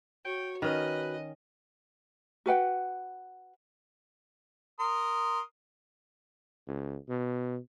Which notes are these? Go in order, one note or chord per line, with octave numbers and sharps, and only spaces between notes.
F#4 C#5 G5
D#3 C#4 B4 D#5
F#4 B4 F#5 G5
A#4 C6 D#6
C#2
B2